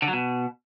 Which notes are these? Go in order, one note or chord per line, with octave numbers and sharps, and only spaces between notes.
D3
F#3
B2